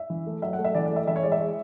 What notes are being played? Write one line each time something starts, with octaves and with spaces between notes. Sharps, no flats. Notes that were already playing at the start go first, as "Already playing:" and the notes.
Already playing: E5
E3
A3
F#3 E5
F#5
A3
E5
E3 D5
A3 D5
E5
E3 E5
C#5
G#3 D5
E5
G#3